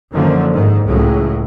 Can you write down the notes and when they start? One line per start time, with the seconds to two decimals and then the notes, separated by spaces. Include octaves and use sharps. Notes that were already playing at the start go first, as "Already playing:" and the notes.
0.12 F#2 D3 D#3 F3 F#3 A#3
0.52 G#2 D#3
0.87 C#2 A2 F#3 G#3